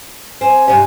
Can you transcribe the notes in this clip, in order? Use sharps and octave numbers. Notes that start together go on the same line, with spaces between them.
C4 G#5
G2 C3 G4